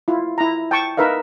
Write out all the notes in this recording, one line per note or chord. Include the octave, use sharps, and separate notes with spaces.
E4 F4
E4 A#5
G5 A5 C#6
D#4 A#4 B4 E5 F5